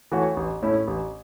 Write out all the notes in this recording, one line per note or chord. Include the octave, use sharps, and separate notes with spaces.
E3 A3 F#4 C#5
A1
A2 A3 C#4 E4
A1